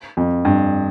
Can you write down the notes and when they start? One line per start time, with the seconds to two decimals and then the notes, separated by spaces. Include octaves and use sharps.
0.17 F2
0.45 G2